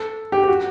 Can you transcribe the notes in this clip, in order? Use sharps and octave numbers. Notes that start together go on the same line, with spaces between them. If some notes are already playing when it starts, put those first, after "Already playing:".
Already playing: A4
G4
G4
F#4